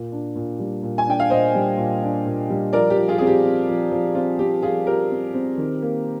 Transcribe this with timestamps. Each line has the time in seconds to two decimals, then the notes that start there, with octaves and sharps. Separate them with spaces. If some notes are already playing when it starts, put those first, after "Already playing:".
Already playing: A#2
0.12 D4
0.36 A#2
0.59 G3
0.83 A#2
0.98 G#5
1.07 D4 G5
1.20 F5
1.30 A#2 C5 D#5
1.55 G3
1.77 A#2
2.02 D4
2.26 A#2
2.50 G3
2.73 F3 A#4 D5
2.90 G4
2.96 F3
3.08 F4 G#4
3.18 C4 G#4
3.27 G4
3.44 C4
3.68 F3
3.91 F3
4.15 C4 F4
4.39 C4 G4
4.62 F3 F4 G#4
4.87 F3 G4 A#4
5.11 C4
5.34 C4
5.57 D#3
5.82 A#3